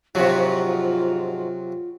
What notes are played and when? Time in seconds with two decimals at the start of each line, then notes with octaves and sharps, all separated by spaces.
0.15 G#2 C3 F3 F#3 F4 F#4